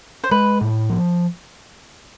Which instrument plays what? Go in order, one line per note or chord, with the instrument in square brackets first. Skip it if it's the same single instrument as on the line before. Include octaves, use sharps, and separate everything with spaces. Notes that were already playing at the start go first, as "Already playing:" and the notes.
[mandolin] C5
[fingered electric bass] G#3 [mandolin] B4
[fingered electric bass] A2
F3